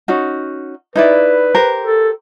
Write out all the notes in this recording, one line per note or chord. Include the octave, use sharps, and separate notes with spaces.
C#4 D#4 F#4
D#4 E4 B4 D5
G4 A#4 C5
A4